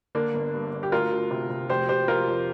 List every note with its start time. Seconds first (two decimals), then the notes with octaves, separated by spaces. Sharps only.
0.15 D3 A#3 D4
0.34 G1
0.54 G2
0.73 D3
0.83 G4
0.92 D2 F4 A#4
1.11 D2
1.31 C3
1.50 C3
1.69 F1 G4 C5
1.88 F1 G4 C5
2.08 F1 F4 A#4
2.27 F2